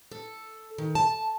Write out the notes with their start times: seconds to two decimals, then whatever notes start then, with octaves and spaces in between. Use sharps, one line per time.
0.12 A4
0.78 D#3
0.95 A5